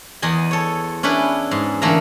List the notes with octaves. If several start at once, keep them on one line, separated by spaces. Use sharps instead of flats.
E2 D#5 G#5 B5
A4 C#5
C#4 D4 E4 B4
G#2
D3 E3 A3 A#3 E5 A#5